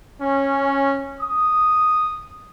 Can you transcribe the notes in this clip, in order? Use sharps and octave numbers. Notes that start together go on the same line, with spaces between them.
C#4
D#6